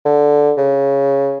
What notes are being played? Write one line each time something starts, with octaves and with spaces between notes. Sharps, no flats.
D3
C#3